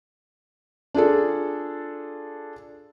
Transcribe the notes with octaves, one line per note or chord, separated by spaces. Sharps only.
D4 F4 G#4 A4